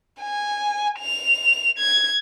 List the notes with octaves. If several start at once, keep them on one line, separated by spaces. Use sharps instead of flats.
G#5
F7
G#6